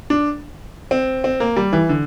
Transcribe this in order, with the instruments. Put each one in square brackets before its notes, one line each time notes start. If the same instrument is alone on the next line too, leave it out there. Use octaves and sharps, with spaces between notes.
[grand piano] D4
C4
C4
A#3
G3
E3
D3